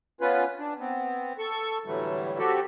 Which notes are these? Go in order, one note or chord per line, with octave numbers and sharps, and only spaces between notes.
B3 C#4 F4 B4
D4
B3 C4
A4 C#6
A2 D3 E3 F#3 G3 A3
C4 F#4 G4 A4